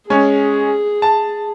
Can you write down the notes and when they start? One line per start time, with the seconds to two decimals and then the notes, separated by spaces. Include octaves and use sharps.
0.10 G#3 C#4 G#4 C#5
1.02 A5